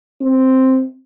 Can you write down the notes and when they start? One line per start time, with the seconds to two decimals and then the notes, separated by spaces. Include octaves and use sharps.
0.22 C4